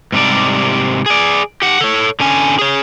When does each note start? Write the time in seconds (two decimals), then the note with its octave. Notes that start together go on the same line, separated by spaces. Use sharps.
0.12 G#2 C3 G3 D5
1.06 G#4 D5
1.62 G4 F#5
1.81 A4 C#5
2.20 D3 C#4 G#5
2.59 G#4 C#5